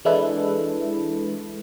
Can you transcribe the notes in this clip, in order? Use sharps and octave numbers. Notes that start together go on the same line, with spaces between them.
E3 G#3 D4 E4 A4 B4